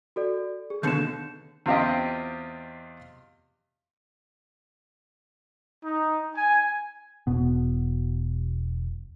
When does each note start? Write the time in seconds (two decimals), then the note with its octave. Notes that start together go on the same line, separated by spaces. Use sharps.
0.16 F#4 A4 D5
0.70 G#4
0.83 D#2 B2 D3 G6 C#7 E7
1.66 E2 C4 F4 G4 D#5
5.84 D#4
6.37 G#5
7.27 E1 B2 B3